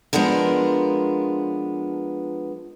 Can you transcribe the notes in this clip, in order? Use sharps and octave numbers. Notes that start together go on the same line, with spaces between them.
F3 G#3 B3 D4 A#4